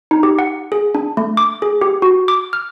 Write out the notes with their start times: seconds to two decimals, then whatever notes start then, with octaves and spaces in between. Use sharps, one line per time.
0.11 D#4
0.23 G4
0.39 F#5
0.72 G#4
0.95 D4
1.17 A3
1.37 D6
1.62 G#4
1.81 G4
2.02 F#4
2.28 D6
2.53 F6